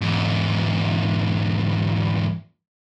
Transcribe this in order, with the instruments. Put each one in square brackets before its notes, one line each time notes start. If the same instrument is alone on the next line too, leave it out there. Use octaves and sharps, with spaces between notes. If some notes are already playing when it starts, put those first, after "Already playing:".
[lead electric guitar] E2 G#2